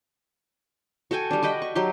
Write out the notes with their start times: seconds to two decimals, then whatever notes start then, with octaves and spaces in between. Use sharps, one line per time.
1.11 F#4 A4 G5 G#5
1.31 G3 D4
1.43 F#4 D#5 G5 B5
1.62 C#6
1.75 F#3 D#4 G4 C6